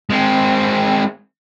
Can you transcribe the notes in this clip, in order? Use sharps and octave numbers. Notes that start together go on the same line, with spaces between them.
G#3 C4